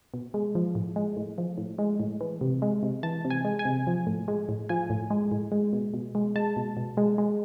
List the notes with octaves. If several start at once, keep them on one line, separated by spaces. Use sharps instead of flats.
B2
G#3
F3
A2
G#3
A2
F3
A2
G#3
A2
E3
C3
G#3
C3
E3 A5
C3
G#5
G#3
G#5
C3
F3
A2
G#3
A2
F3 G#5
A2
G#3
A2
G#3
B2
B2
G#3
G#3 A5
B2
B2
G#3
G#3